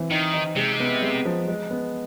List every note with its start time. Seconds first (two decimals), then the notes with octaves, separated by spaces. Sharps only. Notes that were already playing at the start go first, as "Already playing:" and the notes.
Already playing: E3 C4
0.11 D#3 D#4
0.33 D#4
0.56 C3 G#3
0.80 B3
1.02 G#3
1.25 F3
1.48 G#3
1.70 B3